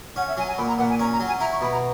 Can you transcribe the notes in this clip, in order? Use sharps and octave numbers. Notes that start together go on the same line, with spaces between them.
C#4 F#5
E5
F#3 G#5
G#5
A#2 B5
A#5
A#2 F#5
G#5
C#4 A#5
A#5
F#3
G#5
E4 A#5
C#6
B2 B5
A#5